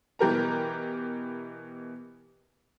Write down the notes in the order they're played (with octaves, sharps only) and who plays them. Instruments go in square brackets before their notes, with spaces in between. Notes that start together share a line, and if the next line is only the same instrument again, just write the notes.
[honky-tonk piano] B2 E3 G4 A#4 A#5